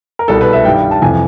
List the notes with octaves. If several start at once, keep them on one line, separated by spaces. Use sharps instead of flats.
A#4
C2 B2 G3 A4
B4
E5
G2 D#3 G3 G5
A5
F2 C3 E3 G#5